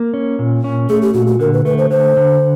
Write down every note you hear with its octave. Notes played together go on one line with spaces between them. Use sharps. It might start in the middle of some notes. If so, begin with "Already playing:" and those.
Already playing: A#3
C#4
A#2
C#4
A3 G#4
G4
A#2 F#4
F#4
D3 A#4
B4
A3 B4
C5
D3 C5
D3